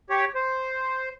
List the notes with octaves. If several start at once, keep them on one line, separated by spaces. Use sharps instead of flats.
G4 C#5
C5